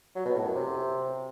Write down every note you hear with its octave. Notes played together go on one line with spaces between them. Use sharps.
F#3
B2
A2
F#2
C3